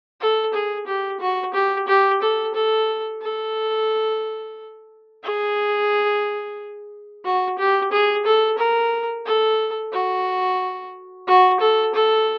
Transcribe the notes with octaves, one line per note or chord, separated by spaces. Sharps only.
A4
G#4
G4
F#4
G4
G4
A4
A4
A4
G#4
F#4
G4
G#4
A4
A#4
A4
F#4
F#4
A4
A4